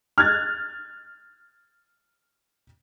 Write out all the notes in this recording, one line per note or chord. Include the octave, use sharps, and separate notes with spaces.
F6 F#6 G#6 A6